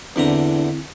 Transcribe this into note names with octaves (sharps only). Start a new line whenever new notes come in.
E2 D3 C4 D4 E4 A#5